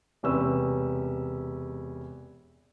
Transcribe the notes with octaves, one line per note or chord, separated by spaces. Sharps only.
E1 C3 C#4 B4 E6